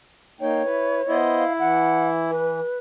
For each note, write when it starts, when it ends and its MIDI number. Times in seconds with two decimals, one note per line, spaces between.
0.41 0.62 58
0.41 0.62 63
0.41 1.18 73
0.41 0.62 79
0.64 1.01 64
0.64 1.01 71
1.08 1.44 59
1.08 2.31 64
1.08 1.44 72
1.08 1.44 75
1.37 1.53 77
1.59 2.60 52
1.59 2.08 78
2.31 2.79 71